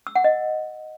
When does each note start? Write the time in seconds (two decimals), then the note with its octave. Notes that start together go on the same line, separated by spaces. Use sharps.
0.07 E6
0.15 F#5
0.24 D#5